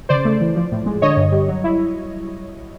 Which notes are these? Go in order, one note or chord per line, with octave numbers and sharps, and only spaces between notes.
C#3 C5 D5
A3
E3
F3
A2
G#3
D3 C#5 D#5
G2
G3
F#3
E4